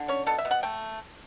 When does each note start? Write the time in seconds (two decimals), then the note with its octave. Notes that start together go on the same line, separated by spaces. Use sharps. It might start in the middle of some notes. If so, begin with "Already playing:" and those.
Already playing: D3
0.08 C#4 C#5
0.26 B2 A4
0.39 E5
0.45 B2
0.51 F#5
0.63 A3 G5